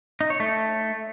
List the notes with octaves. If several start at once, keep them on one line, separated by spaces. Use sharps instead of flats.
D#4
C#5
A3